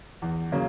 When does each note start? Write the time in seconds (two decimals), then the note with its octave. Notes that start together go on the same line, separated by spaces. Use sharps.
0.22 E2
0.52 C#3 F#3 A#3